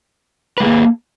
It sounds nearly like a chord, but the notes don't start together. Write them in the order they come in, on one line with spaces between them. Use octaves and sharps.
B4 G#3 G#4 A#3